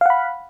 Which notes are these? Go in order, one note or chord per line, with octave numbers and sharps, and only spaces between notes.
F5 F#5 B5